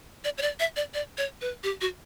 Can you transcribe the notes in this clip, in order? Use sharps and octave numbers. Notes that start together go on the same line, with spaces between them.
D5
C#5
D5
E5
D5
D5
C#5
B4
G4
F#4